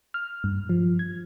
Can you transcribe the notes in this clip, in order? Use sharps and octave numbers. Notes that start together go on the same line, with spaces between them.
F6
G2
F3
G#6